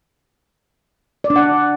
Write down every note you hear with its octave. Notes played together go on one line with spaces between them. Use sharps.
D5
D4
F#5